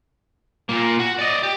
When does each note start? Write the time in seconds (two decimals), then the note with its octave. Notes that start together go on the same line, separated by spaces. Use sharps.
0.69 A#2 A#3
0.99 F#4
1.19 D5 D#5
1.43 G4